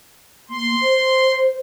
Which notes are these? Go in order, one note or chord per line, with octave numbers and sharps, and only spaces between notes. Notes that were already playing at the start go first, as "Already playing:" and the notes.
A#3 C6
C5